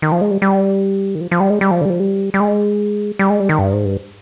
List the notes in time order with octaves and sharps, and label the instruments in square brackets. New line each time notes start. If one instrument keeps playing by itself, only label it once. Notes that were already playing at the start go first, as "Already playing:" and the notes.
[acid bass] D#3
F3
G#3
G3
G3
D#3
F3
F3
G3
G#3
G3
F3
D3
G3
F3
G3
G3
G#3
G3
G#3
G3
D#3
G2
G#2
G2